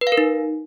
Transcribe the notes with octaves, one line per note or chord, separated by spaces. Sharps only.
B4
F5
A#4
D#4